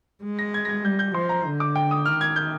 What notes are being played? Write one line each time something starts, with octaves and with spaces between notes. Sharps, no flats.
G#3
A#6
G#6
A#6
G#6
G3 G6
G6
F3 C6
A#5
D3
D6
G5
D#6
D#3 F6
G#6
G6